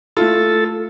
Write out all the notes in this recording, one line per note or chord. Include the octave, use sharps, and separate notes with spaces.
A3 E4 F4 A4